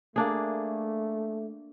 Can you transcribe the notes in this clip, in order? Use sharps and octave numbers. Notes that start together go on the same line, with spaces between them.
A3 A#3 D4 G#4